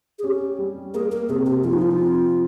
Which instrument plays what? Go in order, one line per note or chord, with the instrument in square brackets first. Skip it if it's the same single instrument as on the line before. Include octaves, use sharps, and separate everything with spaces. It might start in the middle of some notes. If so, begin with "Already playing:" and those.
[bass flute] G#4
[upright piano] C#4 [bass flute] G4
[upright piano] G3
[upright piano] A#3 [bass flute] G#4
[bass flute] A#4
[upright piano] C3 [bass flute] G#4
[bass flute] G4
[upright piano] F3 [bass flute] F4
[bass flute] D#4
F4
[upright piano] C4